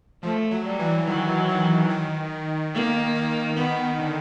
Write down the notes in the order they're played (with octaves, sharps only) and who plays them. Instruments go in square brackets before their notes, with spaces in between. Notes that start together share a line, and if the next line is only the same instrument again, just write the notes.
[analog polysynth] F3 [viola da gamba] A3
[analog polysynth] F#3
[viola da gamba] G3
[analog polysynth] E3
[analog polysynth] D#3 [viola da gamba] F#3
[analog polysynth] D#3
D#3
[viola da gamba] A#3
[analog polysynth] D#3
[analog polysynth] D#3 [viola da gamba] B3
[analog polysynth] D3